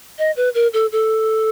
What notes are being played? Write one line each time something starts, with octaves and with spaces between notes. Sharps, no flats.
D#5
B4
A#4
A4
A4